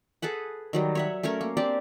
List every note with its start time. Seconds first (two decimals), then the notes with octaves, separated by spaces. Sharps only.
0.22 G#4 A4 B4 F#5
0.73 D#3 F#3 G3
0.95 C#5 E5 F#5
1.23 A3 C#4 A#4 C#5
1.41 A#3
1.57 C4 D4 G4 D5